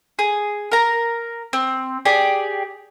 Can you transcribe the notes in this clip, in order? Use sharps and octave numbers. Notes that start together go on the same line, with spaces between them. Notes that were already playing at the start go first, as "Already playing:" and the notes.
G#4
A#4 A#5
C4
G4 G#4 D5